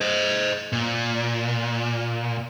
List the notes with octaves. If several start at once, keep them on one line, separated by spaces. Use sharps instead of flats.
C5 D#5
A#2